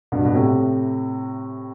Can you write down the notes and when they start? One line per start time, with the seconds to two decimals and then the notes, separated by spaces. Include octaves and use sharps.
0.12 G2 B2
0.25 B2
0.34 A2 C3